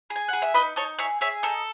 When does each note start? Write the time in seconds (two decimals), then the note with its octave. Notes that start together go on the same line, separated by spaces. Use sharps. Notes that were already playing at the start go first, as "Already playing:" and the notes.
0.10 G#4
0.16 G#5
0.28 G#4 F#5
0.42 E5
0.54 D#4 B4 D#5
0.76 D#4 A4 C#5
0.99 G#4 C#5 E5
1.21 G#4 C#5 E5
1.43 D#4 A4